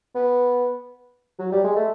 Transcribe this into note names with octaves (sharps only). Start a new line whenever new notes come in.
B3
F#3
G3
G#3
A3